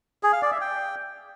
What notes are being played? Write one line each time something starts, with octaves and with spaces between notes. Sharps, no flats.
G#4
F5
D5
E5
G5